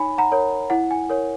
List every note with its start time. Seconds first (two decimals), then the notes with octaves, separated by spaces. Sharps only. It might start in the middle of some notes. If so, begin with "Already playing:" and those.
Already playing: D#4 C#5 G#5 B5
0.18 F#5 A#5
0.32 A#4 C#5
0.70 E4 F#5
0.91 G#5
1.10 A#4 C#5